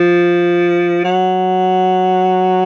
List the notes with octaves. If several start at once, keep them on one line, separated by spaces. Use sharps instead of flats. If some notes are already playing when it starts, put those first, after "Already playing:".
Already playing: F3
F#3